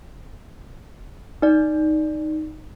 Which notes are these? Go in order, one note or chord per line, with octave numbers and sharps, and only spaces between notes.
D#4 D5